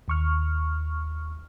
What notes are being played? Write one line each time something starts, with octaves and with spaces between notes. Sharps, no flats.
D#2 C#6 F6